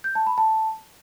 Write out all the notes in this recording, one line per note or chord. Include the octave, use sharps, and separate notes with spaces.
G6
A5
B5
A5